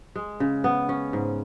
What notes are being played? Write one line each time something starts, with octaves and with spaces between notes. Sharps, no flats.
G#3
C#3
B3
C#4
G#2